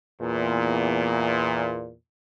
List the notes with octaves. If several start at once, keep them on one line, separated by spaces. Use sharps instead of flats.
E2 A#2